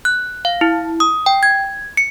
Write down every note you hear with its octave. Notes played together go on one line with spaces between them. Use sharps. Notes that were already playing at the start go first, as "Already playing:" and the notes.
F#6
F5
E4
D#6
G5
G#6
C#7